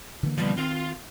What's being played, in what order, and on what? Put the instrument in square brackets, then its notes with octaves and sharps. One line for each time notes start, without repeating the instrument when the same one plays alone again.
[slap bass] D3 E3 A#3
[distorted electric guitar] B2 F3 [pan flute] G3
[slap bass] D#3 [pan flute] C4 [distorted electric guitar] F4 F5